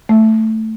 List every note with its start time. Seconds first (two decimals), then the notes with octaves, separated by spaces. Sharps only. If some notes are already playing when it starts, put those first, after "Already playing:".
0.09 A3